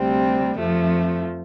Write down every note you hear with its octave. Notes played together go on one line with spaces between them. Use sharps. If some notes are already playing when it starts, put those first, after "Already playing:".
Already playing: D2 C3 G3 C4
F2 F3 A3